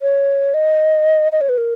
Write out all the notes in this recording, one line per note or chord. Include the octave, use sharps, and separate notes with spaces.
C#5
D#5
D#5
C#5
B4
A#4